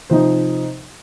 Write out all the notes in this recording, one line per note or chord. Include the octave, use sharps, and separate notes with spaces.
C3 F3 D#4 C5